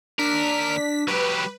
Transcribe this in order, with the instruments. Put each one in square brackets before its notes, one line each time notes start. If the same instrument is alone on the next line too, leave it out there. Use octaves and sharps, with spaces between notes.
[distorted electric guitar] D#2 A#4 [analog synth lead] D4 [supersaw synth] B6
[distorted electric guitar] F#3 G4 [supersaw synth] B4